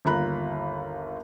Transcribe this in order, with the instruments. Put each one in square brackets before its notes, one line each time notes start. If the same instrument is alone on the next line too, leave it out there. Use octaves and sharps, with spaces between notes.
[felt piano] G1 D#2 F4 A#5 B5 F#6